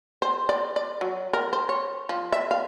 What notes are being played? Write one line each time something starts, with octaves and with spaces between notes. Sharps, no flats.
C5
D5
D5
F#3
A#4
C5
C#5
F3
E5
F5